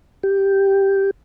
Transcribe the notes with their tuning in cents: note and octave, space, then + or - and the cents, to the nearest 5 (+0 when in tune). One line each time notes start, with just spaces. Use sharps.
G4 +0